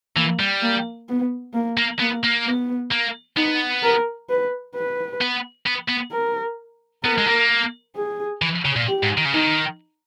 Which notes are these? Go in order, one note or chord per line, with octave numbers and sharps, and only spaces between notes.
E3 A#3
G3
A#3
B3
A#3
A#3
A#3 B3
A#3
B3
A#3
B3 D#4
A#4
B4
B4
B3
B3
B3
A#4
B3 A#4
G#3
A#3
G#4
E3
C#3
A#2
G4
G#2
D#3
C#3
D#3 D#4